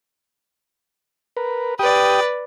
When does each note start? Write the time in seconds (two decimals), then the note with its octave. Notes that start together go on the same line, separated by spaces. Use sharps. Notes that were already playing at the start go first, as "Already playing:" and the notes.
1.37 A#4 B4
1.79 G4 B4 D5 G5 D#6